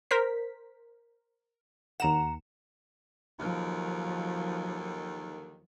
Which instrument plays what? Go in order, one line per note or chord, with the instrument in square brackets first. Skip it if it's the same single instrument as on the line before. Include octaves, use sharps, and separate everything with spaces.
[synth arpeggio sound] A#4 C5 B6
[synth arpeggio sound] D#2 E7 [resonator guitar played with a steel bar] F#5 A#5
[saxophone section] D#2 D3 D#3 [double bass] F3 F#3